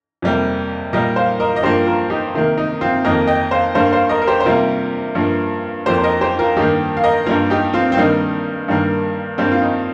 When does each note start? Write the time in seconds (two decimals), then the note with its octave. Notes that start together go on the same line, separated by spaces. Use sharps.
0.22 F2 C3 G3 A#3
0.93 A#2 G3 A#3 A#4 D#5
1.16 C5 F5
1.40 A#4 D#5
1.56 D#5
1.63 G2 F3 A#3 G4 C5
1.86 F4 A#4
2.10 D#4 G4
2.34 C3 D#3 A#3
2.58 D#4
2.81 C4 F4
3.04 F2 D#3 A#3 A#4 D#5
3.27 D#5 G5
3.51 C5 F5
3.75 G2 G3 A#3 C5 F5
3.92 C5 F5
4.09 A#4 D#5
4.22 A#4
4.27 G4 C5
4.40 C5
4.45 C3 G3 A#3 F4 A#4
5.15 G2 F3 A#3
5.86 F2 F3 A#3 G4 C5
5.98 C5
6.04 A#4 D#5
6.21 G4 C5
6.39 F4 A#4
6.57 G2 D#3 A#3 D#4 G4
6.97 F5
7.04 A#4 D#5
7.26 G2 G3 A#3 F4 A#4
7.50 D#4 G4
7.73 C4 F4
7.92 C4
7.97 G2 D#3 G3 A#3 D#4
8.68 G2 D#3 G3 A#3
9.38 G2 G3 A#3 C4
9.52 F4
9.62 D#4